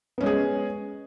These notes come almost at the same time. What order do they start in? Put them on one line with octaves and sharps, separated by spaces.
B3 C#4 G#3 G#4